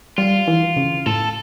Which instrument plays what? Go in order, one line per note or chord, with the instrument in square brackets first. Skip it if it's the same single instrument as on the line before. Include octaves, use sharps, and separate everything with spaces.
[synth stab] G3 [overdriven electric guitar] F4
[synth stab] E3
C#3
[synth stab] A2 [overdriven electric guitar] A4